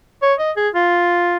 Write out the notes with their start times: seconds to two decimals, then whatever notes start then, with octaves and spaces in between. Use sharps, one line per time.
0.22 C#5
0.39 D#5
0.57 G#4
0.75 F4